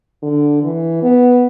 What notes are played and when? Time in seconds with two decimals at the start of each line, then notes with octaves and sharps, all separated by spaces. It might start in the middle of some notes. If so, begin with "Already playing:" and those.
0.23 D3
0.63 E3
1.02 B3